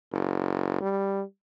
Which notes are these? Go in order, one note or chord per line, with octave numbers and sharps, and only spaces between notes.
F#1
G3